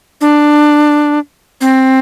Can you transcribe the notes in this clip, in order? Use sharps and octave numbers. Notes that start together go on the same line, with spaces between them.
D4
C4